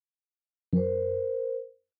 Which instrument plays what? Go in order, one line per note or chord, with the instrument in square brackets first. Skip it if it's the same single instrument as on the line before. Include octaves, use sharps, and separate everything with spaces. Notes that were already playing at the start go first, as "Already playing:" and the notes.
[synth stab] F#2 [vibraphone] A#4 C5